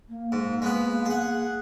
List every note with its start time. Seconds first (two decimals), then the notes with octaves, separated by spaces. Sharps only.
0.09 A#3
0.32 G#2 A#3
0.62 G#3 B3 B4
1.06 G#4 F#5